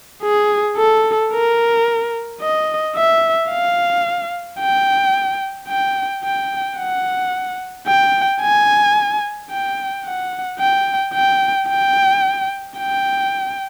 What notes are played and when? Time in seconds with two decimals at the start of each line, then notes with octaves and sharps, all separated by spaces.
0.23 G#4
0.78 A4
1.33 A#4
2.41 D#5
2.96 E5
3.51 F5
4.60 G5
5.69 G5
6.24 G5
6.78 F#5
7.87 G5
8.42 G#5
9.51 G5
10.05 F#5
10.60 G5
11.14 G5
11.69 G5
12.78 G5